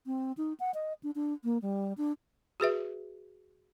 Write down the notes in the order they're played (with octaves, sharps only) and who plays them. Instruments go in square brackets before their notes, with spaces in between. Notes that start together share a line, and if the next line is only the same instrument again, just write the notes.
[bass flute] C4
D#4
F#5
D#5
D4
D4
A#3
G3
D4
[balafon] F#4 G#4 B4 E5